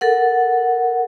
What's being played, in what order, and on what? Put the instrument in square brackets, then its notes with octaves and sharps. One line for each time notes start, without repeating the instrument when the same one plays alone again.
[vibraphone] A4 A#4 F#5